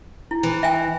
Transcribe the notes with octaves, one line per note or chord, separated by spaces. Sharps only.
E4
E3
E5 G5 G#5